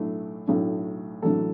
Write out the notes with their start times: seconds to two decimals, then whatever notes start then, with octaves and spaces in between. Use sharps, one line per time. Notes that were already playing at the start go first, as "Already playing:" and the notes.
Already playing: B1 A2 A3 D4
0.47 B1 A2 A3 D4
1.22 A1 A2 F#3 D4 A4